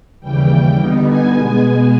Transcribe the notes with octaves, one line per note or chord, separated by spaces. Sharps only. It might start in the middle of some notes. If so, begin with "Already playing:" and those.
D#2 C#3 E3 G3 G5
D3 G3 B3 D#4
G#5
B2 G#3 B3
G#5